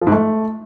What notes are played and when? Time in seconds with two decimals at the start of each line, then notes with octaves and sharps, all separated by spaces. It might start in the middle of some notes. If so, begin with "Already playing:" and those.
0.01 F3
0.07 G#2
0.12 A3